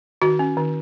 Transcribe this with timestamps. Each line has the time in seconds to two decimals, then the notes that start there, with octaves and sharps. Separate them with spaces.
0.22 D#3 F#4
0.39 C#4
0.57 D#3